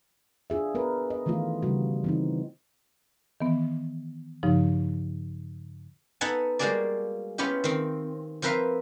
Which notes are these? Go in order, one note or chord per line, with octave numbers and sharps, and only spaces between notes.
D4 F4 G#4 E5
B3 A#4 B4
D#5
D#3 E3 A3 B3 F4
C#3 G3 F#4
E3 C4 D#4
D#3 E3 B3
G2 C#3 F3 D#4
B3 D#4 A4 F#5 G#5 A5
G3 G#3 A#3 F#4 G#4 D5
B3 C#4 E4 F4 G4
D#3 C4
F3 C4 A#4 B4 E5 F5